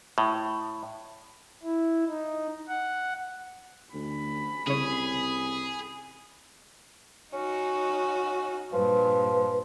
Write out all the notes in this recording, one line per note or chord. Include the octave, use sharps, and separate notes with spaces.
A2
E4
D#4
F#5
D2 C#4 B5
C2 C#3 G#4 C#5
C#4 D#4 F#4
G2 A#2 F3 B4